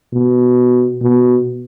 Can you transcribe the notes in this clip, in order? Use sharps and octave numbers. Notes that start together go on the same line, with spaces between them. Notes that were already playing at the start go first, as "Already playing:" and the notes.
B2
B2